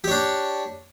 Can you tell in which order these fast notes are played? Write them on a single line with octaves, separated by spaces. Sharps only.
G4 C#5 D4